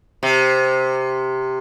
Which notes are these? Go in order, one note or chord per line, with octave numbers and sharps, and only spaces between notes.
C3